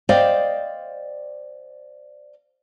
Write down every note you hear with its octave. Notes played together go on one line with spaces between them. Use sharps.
C5 D5 D#5 F5 G5